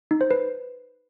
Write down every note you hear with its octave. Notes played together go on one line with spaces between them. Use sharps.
D#4
C5
B4